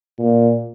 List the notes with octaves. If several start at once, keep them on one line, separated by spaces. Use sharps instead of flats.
A#2